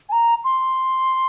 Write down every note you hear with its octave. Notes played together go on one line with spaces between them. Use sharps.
G#5
A#5
C6